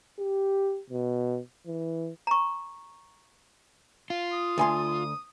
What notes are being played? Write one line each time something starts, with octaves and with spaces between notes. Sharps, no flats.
G4
B2
E3
A#5 C#6
F4
D#6
D2 G#5 C6